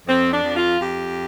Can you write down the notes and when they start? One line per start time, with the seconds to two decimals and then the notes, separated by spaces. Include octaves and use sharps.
0.07 F2 C4
0.31 D4
0.43 F2
0.55 F4
0.79 F2 G4